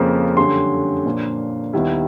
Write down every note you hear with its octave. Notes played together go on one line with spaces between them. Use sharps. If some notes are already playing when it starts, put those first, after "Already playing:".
Already playing: F2 C#3 F3 A#3
F#2 D3 G3 C6
A#2 F3 A#3 D4
D#2 D#3 G3 B3 E4